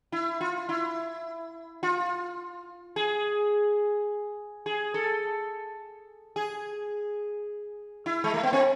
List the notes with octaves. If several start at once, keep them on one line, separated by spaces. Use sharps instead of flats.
E4
F4
E4
F4
G#4
G#4
A4
G#4
E4
G#3
A3
B3
C4